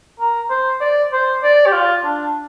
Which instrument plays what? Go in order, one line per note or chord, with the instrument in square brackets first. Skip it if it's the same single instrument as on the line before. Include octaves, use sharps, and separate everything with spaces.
[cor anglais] A#4
C5
D5
C5
D5
G4
F4
D4